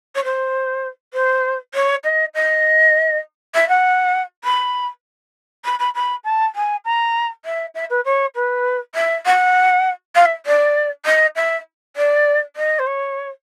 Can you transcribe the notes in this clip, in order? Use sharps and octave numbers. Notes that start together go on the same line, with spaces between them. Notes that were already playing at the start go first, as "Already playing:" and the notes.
C#5
C5
C5
C#5
D#5
D#5
E5
F#5
B5
B5
B5
B5
A5
G#5
A#5
E5
E5
B4
C#5
B4
E5
F#5
F5
E5
D5
D#5
E5
D5
D#5
C5
C#5